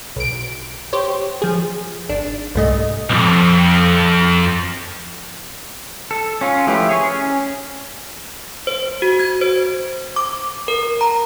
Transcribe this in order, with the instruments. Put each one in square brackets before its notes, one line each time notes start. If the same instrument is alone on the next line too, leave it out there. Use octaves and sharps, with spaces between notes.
[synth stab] B1 D7
G4 C5 C#5
F3 G#4
G#1 D4
C2 G#2 A3 D#5
[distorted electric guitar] B1 F2
[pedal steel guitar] A4
C#4 F4
F3 A3 E4 G4 B4
G#4 C#5
C#4
[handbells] C5
F#4
G#6
C5
D6
A#4
A#5